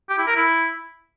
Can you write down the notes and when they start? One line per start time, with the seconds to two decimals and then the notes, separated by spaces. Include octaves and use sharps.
0.09 G4
0.18 E4
0.27 A#4
0.36 E4